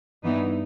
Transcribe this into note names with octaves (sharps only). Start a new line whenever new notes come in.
G2 E3 B3 D#4